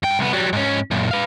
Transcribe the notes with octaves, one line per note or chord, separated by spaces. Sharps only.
G2 G5
C2 B3
F#3 G3
G#2 C#4
F#2 A#2
B4 F5